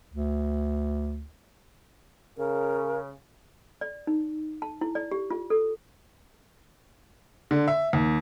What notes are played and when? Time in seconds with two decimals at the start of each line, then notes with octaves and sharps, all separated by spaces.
0.14 D2
2.38 C#3 A#4
3.81 D5
4.07 D#4
4.62 A5
4.81 E4
4.95 D5
5.12 G4
5.31 F4
5.50 A4
7.51 D3
7.68 E5
7.93 D#2